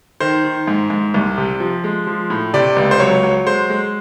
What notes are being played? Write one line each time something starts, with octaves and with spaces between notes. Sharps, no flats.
D#3 C5
D#3
G#2
G#2
C2
C3
F3
G#3
F3
A2
C3 D5
C#2
C5
F#3 C#5
F#3
G#3 C5
G#3